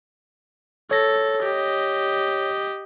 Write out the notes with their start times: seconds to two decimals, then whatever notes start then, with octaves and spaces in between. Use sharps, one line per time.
0.91 A4 C#5 A#6
1.43 G4 D#5